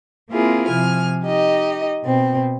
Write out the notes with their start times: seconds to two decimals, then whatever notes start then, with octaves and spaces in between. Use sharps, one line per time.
0.30 A#3 C4 E4 F4 G#4 A#4
0.66 C3 F3 G#5 F6
1.24 D#4 G4 D#5
2.03 B2 C4